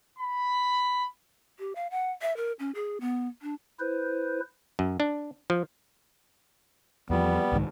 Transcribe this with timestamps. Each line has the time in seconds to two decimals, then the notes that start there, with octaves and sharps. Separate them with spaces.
0.19 B5
1.59 G4
1.75 F5
1.91 F#5
2.22 E5
2.37 A#4
2.59 C#4
2.75 G#4
3.01 B3
3.42 D4
3.80 E4 B4 C5
4.79 F#2
5.00 D4
5.50 F3
7.10 E2 F3 G3 B3
7.52 C2 G#2 D#3